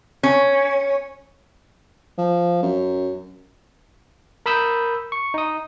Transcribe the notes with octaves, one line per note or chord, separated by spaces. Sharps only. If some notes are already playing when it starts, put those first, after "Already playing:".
C#4
F3
F#2
A#4 B5 D#6 E6 G6
C#6
D#4 D#6